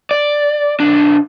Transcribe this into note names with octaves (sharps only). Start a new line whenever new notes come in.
D5
B1 D4